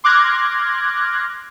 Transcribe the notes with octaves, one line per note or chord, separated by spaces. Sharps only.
C6 D6 F6 F#6 G#6 A#6